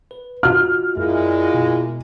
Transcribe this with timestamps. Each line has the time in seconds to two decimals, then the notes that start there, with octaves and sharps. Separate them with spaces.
0.11 B4
0.43 F4 F#4 D#5 F6
0.97 F#2 A#2 G#3 E4
1.54 B2